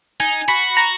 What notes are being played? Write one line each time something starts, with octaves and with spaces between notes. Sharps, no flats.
D#4 G#5
F#4 B5
A#5